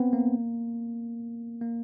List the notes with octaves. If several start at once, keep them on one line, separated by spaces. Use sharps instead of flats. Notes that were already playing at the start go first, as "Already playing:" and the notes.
Already playing: B3 C4
A#3
A#3